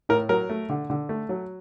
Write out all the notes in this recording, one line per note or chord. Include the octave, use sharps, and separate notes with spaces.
A2 A#4
F#3 A#4
A3
D3
D3
A3
F#3